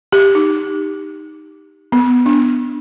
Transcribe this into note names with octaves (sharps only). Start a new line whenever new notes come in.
G4
D#4
B3
D4